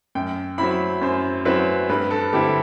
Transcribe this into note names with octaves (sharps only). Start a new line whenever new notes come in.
F#2 G5
F#3 C4 E4 B5
F#2 C5
F#3 C4 E4 B4
G2 B4
A4
D3 G3 C4 E4 G4